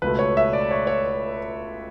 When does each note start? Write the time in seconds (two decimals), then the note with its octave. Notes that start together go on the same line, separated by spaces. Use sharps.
0.02 C#2 B2 A3 B4
0.19 C#5
0.37 E5
0.53 D5
0.71 C#5
0.87 C#5